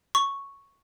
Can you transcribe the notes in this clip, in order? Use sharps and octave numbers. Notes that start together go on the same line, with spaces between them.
C#6